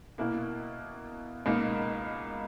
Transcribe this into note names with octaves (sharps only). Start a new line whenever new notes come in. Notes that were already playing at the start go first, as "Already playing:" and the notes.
B2 A#3 E4
C#2 B2 A#3 D#4